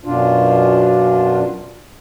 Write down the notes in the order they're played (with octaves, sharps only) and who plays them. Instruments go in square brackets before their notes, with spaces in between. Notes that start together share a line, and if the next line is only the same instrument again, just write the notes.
[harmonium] F#2 B2 D4 F4